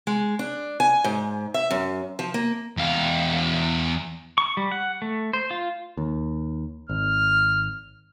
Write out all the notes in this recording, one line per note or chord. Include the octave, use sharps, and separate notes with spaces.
G#3
D4
G#5
G#2
E5
F#2
F3
A#3
E2 F5
C#6
G3
F#5
A3
C5
F4
D#2
G#1 F6